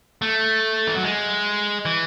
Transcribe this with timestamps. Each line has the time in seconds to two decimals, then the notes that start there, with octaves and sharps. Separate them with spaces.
0.22 A3
0.87 E3
0.95 F#3
1.03 G#3
1.85 E3